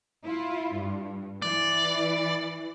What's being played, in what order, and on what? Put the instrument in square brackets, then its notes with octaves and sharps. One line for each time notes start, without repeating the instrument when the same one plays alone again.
[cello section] E4 F4
G2
[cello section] E3 [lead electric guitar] D5